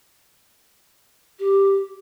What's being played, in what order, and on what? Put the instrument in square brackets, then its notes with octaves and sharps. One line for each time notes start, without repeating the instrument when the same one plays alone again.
[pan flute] G4